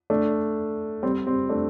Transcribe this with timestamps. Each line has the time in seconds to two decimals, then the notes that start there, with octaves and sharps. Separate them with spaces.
0.10 A3 D4
1.03 G3 C4
1.27 G3 C4
1.49 A3 D4